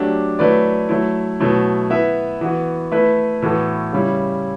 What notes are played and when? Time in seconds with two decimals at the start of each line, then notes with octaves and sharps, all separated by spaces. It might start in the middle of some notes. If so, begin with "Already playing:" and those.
Already playing: F#3 A3 D4 G4
0.39 F#3 A3 E4 B4 D5
0.89 F#3 A3 E4
1.40 B2 F#3 A3 E4
1.90 B3 E4 B4 E5
2.41 E3 B3 F#4
2.92 A3 E4 B4 E5
3.42 A2 E3 B3 F#4 A4
3.93 C#3 G3 C#4 E4